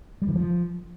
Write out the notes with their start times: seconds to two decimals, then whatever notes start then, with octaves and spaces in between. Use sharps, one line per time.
0.22 G3
0.28 D#3
0.35 F3